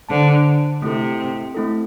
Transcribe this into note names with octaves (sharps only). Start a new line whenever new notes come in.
D3 D4 C5 A5
C3 A3 C4 E4 A4
A3 C4 E4 A4